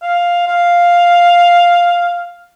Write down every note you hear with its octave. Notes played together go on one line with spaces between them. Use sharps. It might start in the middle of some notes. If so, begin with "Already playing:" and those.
F5
F5